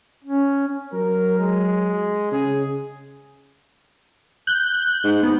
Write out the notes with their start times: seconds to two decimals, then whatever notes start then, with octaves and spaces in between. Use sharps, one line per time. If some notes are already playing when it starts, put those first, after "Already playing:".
0.24 C#4
0.93 F#3 A#4
1.39 G#3
2.32 C#3 G#4
4.47 F#6 G6
5.03 G#2
5.23 G#2 B3